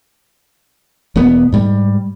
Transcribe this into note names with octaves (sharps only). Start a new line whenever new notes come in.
E1 A#3 B3
G#2 G3